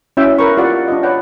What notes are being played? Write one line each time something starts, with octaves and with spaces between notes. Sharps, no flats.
C#4 E4 F#4 E5 G5 E6
A#4 B4 C#6
F4 G4 D5 F#5
D4 F4 D#5
B4 C#5 D5 F#5 G5